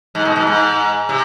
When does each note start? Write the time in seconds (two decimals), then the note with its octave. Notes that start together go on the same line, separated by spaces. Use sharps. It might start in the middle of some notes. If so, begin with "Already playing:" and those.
0.15 G#2
0.25 B2
0.36 G#2
0.47 G#2
1.09 C3